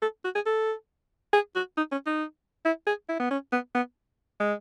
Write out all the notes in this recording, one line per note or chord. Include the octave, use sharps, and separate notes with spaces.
A4
F#4
G#4
A4
G#4
F#4
D#4
C#4
D#4
E4
G#4
E4
B3
C#4
B3
B3
G#3